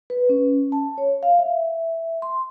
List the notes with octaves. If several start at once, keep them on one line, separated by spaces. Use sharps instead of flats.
B4
C#4
A5
C#5
F5
E5
C6